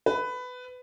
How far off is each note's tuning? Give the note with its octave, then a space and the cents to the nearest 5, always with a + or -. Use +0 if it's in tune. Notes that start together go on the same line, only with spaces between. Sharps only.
B4 +15